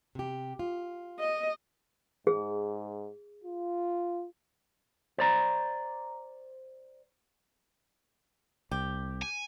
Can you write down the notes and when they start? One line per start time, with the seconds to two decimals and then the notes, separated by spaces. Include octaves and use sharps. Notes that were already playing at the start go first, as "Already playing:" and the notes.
0.15 C3 G4
0.59 F4
1.19 D#5
2.27 G#2 G#4
3.44 F4
5.18 C5 D5 A#5
8.71 C2 G4
9.22 G#5